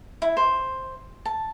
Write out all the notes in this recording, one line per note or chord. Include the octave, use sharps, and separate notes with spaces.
E4
C5
A5